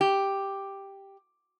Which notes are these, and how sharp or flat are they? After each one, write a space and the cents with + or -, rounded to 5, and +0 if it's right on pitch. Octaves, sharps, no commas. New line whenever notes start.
G4 +0